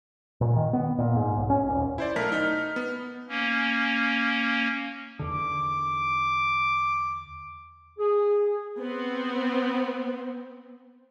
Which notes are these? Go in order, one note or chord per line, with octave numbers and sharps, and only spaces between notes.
A#2
D#3
B3
A#2
G#2
B1
C#4
D#1
E4 C5 D5
B1 A3 A#4 A5 F6 B6
D#4 F6 B6
B3
A#3 C#4
E2 D3 D6
G#4
B3 C4